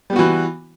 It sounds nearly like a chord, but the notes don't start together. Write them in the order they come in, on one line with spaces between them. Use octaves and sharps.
G3 B3 F#4 E3